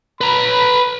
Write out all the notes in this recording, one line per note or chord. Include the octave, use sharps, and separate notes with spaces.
B4 A#5 B5